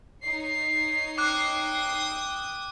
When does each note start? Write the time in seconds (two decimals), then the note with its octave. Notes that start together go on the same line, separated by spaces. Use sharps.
0.22 D#4 C#5 C7
1.18 G5 D6 D#6 F#6